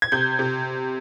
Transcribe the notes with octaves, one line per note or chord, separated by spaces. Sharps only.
G#6
C3 G6
C3